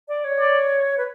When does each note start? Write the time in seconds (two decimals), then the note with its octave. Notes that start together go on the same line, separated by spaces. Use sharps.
0.08 D5
0.24 C#5
0.39 D5
0.98 B4